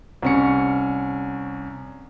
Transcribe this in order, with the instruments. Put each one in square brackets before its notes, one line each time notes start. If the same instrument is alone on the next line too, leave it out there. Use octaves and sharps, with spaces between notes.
[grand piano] C2 C#4 C#7